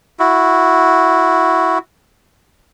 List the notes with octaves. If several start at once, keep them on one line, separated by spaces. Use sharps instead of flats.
E4 F#4